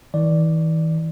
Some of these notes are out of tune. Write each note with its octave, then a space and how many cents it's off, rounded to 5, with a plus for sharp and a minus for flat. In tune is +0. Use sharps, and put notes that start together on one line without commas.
E3 -45 D5 +0